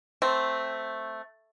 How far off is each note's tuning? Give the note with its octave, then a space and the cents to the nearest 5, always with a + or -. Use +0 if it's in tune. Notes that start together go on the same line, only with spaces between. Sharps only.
A3 +0 C4 +0